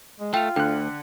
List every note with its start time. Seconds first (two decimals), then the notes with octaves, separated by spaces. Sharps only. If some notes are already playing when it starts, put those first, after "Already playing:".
0.20 G#3
0.34 A3 F4 G5 F7
0.56 D2 D3 G5 F#6